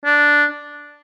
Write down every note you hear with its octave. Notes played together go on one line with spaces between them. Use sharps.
D4